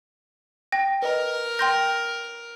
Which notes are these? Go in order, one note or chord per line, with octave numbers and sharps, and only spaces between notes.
G5 A#6
A#4 B4 D#5
G5 C6 G6 A#6